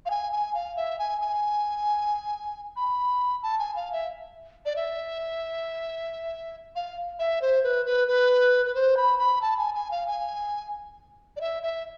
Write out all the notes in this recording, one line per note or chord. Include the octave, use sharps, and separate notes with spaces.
F5
G#5
G#5
F5
E5
G#5
G#5
B5
A5
G#5
F5
E5
D5
E5
F5
E5
C5
B4
B4
B4
B4
C5
B5
B5
A5
G#5
G#5
F5
G#5
D5
E5
E5